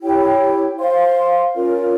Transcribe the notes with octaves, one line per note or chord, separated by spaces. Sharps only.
E4 G4 C#5 G5
C5 F5 C6
C#4 F4 A#4 C#5